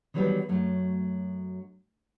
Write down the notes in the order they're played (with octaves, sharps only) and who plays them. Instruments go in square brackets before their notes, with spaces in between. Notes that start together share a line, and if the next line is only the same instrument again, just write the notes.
[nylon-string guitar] D#3 E3 F#3 G3 B3 B4
F#2 F#3 A3